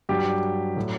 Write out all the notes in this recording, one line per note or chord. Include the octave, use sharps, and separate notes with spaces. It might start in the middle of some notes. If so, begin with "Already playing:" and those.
G2 F#3 G4
A2 F#3